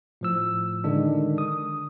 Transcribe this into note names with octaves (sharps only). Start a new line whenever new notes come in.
A2 F3 E6
D3 D#3 G#3 D4
D#6